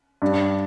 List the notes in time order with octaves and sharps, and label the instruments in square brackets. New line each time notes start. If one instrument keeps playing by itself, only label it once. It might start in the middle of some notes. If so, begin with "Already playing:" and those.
[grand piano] G2